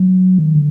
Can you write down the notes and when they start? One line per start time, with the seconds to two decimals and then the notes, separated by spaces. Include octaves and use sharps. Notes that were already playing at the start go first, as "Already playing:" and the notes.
Already playing: F#3
0.38 D#3
0.55 D3